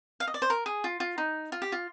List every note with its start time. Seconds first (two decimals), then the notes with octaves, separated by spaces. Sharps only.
0.20 F5
0.27 D#5
0.34 D5
0.42 C5
0.50 A#4
0.66 G#4
0.84 F4
1.00 F4
1.18 D#4
1.52 F4
1.62 G4
1.72 F4